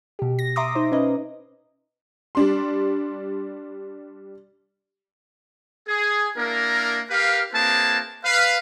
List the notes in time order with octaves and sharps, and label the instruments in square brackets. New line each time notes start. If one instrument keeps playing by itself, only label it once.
[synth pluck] B2 G4
A#6
E5 A#5 C6 D6 D#6
D#4 C5
C#4 B4 D#5
[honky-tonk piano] G3 D4 C6
[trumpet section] G#4
A#3 D4 E4 A#4
G4 A#4 B4 F5
A#3 C4 E4 G#4 B4 A5
B4 F5